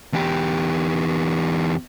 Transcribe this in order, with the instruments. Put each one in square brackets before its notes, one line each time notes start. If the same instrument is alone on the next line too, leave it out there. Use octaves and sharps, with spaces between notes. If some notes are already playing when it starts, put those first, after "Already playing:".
[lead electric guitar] E2 G4